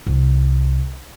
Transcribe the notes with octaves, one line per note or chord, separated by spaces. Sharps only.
C2